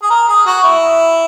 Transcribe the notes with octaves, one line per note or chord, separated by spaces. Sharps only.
G#4
A#4
G#4
F#4
E4